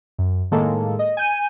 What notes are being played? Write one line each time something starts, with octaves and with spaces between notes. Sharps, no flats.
F#2
A2 D#3 G#3 A#3 A4
D#5
G#5 G6 D#7